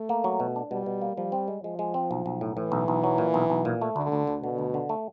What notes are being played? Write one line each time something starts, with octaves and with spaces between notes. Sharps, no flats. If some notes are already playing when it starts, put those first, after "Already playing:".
Already playing: A3
A#3
F#3
B2
D4
B2 G3
B2
A#3
F3 G3
C4
G#3
F3 G#3
G#3
C4
B1
B1
A2
A2 E3
B1
B1
F#3
A#2
B1
B1
A#2
A3
D2 D3
D2
D2
B2 D3
D2
D3
A3